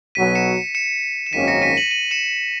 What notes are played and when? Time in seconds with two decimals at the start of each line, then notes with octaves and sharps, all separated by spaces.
0.15 B1 B2 F#3 B6 D#7
0.35 C#7 E7
0.75 C#7 E7
1.26 E7
1.33 G#1 F#2 D#3 A#3 C#4 B6 D#7
1.48 A#6 C#7
1.62 B6 D#7
1.76 D#7 F#7
1.91 D#7 F#7
2.11 C#7 E7